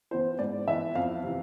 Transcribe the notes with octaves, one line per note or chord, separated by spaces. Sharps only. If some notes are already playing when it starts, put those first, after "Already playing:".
E3 B3 E4 C5
G#2 D5
E3 B3 E4 E5
F2 F5
C3 E3